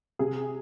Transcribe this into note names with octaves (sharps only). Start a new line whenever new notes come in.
C3 G#4